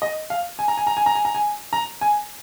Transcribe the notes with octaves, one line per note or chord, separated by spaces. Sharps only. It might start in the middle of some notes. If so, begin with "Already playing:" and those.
D#5
F5
G#5
A#5
G#5
A#5
G#5
A#5
G#5
A#5
G#5
A#5
G#5